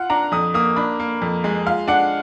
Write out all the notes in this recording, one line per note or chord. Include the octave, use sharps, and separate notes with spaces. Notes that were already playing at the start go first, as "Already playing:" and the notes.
Already playing: F4 F#5
D4 A#5
F2 D#6
A#3 D#6
D4 B5
A#3
F2
G#3
F4 F5
D4 F#5